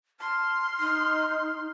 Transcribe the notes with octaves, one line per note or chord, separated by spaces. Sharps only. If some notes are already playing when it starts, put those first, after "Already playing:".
A5 C6 F6
D#4